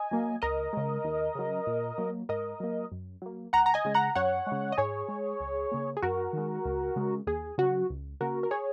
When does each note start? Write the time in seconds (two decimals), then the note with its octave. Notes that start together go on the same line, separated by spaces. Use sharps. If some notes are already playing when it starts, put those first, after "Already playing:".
Already playing: D#5 G#5
0.11 F#3 A#3
0.42 C#2 A#4 D#5
0.73 C#3 G#3
1.04 D#2
1.35 C#3 F#3
1.67 A#2
1.98 F#3 A#3
2.29 G#2 A#4 D#5
2.60 F#3 A#3
2.92 F#2
3.22 F#3 A#3
3.53 C#2 F#5 A#5
3.66 A#5
3.74 D#5 G#5
3.85 C#3 G#3
3.94 F#5 A#5
4.15 F#2 C#5 F#5
4.47 C#3 G#3
4.72 D#5
4.78 G#2 G#4 C#5
5.09 G#3
5.40 C#2
5.72 C#3 A#3
5.97 G#4
6.02 F#2 F#4 A#4
6.33 D#3 G#3
6.65 C#2
6.96 C#3 G#3
7.27 D#2 G#4
7.58 C#3 F#3 F#4
7.90 C#2
8.21 C#3 A#3 F#4 A#4
8.43 A#4
8.51 G#4 C#5